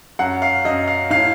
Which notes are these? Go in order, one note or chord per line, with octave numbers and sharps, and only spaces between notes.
F#2 F#5
F5
F#2 D#5
F5
A2 F5